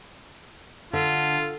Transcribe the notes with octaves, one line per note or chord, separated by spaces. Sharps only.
D3 F4